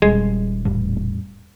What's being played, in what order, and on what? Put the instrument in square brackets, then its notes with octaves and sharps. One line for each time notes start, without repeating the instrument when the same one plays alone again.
[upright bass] D#1 [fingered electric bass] G3 [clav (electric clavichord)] G#3 G#5
[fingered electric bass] E2 A2 G3